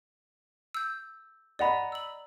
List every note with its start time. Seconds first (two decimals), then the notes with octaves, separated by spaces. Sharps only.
0.75 E6 G6
1.59 D5 D#5 F#5 A#5 B5
1.92 E6 F#7